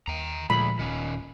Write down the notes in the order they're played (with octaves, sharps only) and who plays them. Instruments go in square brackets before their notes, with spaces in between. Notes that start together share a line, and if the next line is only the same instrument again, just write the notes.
[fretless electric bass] D#2 [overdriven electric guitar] G5 A#5
[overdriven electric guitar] D2 [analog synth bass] A#2 [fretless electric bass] F3 G#3 [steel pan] B5
[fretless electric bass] D#1 [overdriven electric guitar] D#3 C#4